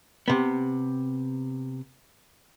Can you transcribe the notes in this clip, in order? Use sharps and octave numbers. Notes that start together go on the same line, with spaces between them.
C3 B3